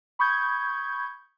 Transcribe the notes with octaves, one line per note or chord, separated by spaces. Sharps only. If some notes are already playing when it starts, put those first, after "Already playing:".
B5 C#6 D#6 G6 G#6